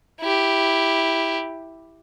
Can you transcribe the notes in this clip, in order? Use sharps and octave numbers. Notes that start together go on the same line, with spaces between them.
E4 G4